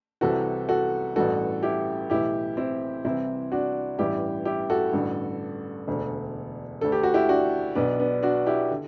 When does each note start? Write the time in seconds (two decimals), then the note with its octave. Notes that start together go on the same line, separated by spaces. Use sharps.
0.21 C2 C3 E3 F#4 A4
0.69 F#4 A4
1.16 A1 G2 E3 F#4 A4
1.63 E4 G4
2.10 B1 A2 E3 E4 G4
2.57 C4 E4
3.04 C2 C3 E3 C4 E4
3.52 D4 F#4
3.98 A1 G2 E3 E4 G4
4.45 E4 G4
4.70 F#4 A4
4.93 A1 G2 D3
5.87 E1 D2 D3
6.81 D2 D3 A4
6.92 G4
7.03 F#4
7.14 E4 G4
7.29 D4 F#4
7.75 B1 B2 B3 D4
8.00 B3 D4
8.23 D4 F#4
8.46 E4 G4
8.71 D3